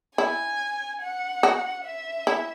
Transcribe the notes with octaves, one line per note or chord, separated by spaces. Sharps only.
E4 G#5
F#5
F#4
E5
E4